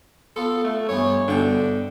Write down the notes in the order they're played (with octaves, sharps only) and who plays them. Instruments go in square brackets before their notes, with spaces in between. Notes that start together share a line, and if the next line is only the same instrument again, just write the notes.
[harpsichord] B3 F4 [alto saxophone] A4
[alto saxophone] A3
[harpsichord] G2 E3 B3 [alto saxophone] C#5
[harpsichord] G2 B2 G5 [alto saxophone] D3